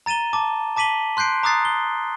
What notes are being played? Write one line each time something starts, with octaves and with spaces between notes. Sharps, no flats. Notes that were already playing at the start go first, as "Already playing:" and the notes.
A#5 A6 D#7 E7 G7
A5 D6
A5 D6 B6 D#7 F#7 G7
C6 F#6 G6 C7 D7
A#5 D6 D#6 F#6 A6 C7
G7